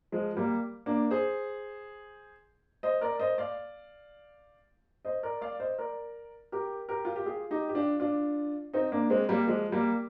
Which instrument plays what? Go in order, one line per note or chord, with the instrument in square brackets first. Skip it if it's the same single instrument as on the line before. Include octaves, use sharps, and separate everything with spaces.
[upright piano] F3 G#3
G3 A#3
A#3 D4
G#4 C5
C5 D#5
A#4 D5
C5 D#5
D5 F5
C5 D#5
A#4 D5
D5 F5
C5 D#5
A#4 D5
G4 A#4
G4 A#4
F4
G4
F4 G#4
D#4 G4
G4
D4 F4
D4 F4
C4 D#4
A#3 D4
G#3 C4
G3 A#3
F3 G#3
G3 A#3